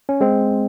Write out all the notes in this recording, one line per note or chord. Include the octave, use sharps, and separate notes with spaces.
C#4
G#3 C4